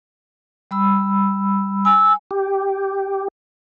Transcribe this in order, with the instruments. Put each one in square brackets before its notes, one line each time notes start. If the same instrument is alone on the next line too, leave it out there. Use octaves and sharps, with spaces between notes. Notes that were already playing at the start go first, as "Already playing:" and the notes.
[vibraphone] G3 B5 E6
[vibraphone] G#5 [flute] E6
[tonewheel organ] G4